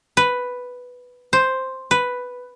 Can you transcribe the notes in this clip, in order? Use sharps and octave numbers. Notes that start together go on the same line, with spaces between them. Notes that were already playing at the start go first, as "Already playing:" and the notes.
B4
C5
B4